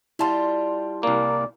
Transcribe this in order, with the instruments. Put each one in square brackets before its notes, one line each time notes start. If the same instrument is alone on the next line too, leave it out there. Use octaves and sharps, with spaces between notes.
[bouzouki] G3 F4 [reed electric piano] E4 A5 C6
[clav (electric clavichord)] C2 A#3 [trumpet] D5